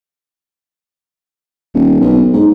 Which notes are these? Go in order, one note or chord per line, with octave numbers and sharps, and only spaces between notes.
D#1
B1
G#2